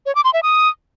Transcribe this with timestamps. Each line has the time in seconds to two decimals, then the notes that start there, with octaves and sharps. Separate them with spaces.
0.06 C#5
0.15 D6
0.24 C6
0.34 E5
0.43 D#6